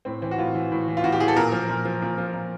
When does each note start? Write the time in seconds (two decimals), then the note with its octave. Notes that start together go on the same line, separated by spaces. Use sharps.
0.05 A2 C4
0.22 E3 C4
0.31 F#4
0.38 A2 F4
0.55 E3
0.72 A2
0.88 E3
0.97 F4
1.04 A2 F#4
1.12 G4
1.20 E3 G#4
1.28 A4
1.36 A#2 A#4
1.52 F3
1.69 A#2
1.85 F3
2.02 A#2
2.18 F3
2.34 A#2